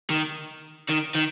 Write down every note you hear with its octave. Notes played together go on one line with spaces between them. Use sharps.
D#3
D#3
D#3